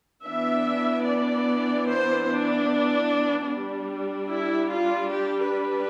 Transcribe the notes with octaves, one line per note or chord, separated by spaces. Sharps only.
E3 B3 D4 E5
D5
C5
D4
G3 D4
E4
F4
G4
B4